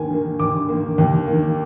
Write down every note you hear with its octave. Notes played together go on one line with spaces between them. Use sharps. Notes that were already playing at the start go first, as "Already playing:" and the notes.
Already playing: D#2 D#3 A#3 G#5
D#3 A#3
D#2 D6
D#3 A#3
D#2
A#3
D#3